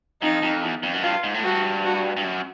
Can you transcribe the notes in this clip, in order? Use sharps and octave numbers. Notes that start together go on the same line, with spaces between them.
F2 D#4
F2
E2
F2
F#2
G2 F4
G#2
A2
G2 F#4
F#4
G2
F#2